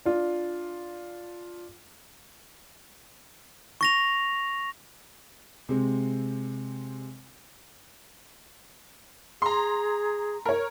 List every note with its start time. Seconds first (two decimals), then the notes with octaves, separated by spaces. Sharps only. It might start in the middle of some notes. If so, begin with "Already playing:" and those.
0.05 D4 F4
3.81 C#6 A#6 F7
5.69 C3 G#3 C4
9.42 G#4 A#5 C6
10.46 A#4 C#5